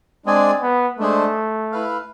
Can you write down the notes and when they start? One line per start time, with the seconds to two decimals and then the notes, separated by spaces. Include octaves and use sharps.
0.26 G#3 C4 D4 G#4 D5 G#5
0.62 B3
0.99 G#3 A3 D4 G#4 C5
1.72 E4 B4 F5